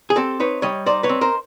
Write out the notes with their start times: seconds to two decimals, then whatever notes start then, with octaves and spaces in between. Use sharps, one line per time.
0.10 G#4
0.16 C4 G4 A4
0.40 D#4 B4 C#5
0.62 G3 C#5 D#5
0.86 D#4 C5 D5
1.03 B4 C#5
1.09 C4
1.21 A#4 C5